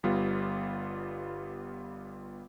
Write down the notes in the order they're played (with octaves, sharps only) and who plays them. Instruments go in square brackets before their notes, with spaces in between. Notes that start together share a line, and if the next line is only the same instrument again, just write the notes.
[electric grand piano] G1 G3 B3 F4